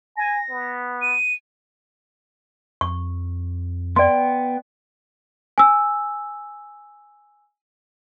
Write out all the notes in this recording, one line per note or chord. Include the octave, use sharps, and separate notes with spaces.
G#5 A#6
B3
D#7
F2 C#6
B3 D5 G5 C6
G#5 E6